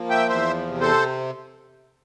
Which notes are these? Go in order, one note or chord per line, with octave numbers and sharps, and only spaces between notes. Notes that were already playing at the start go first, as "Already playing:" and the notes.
Already playing: F3 A#3
E5 G5
E2 C5 E5
C3
A4 C5